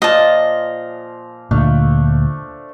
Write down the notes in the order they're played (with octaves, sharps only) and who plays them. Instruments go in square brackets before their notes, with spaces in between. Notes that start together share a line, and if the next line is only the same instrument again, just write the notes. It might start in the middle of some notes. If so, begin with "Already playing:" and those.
[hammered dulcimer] A#2 F3 F5 [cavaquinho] D#5 A5
[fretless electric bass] D2 A#2 [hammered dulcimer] A3 D4 F5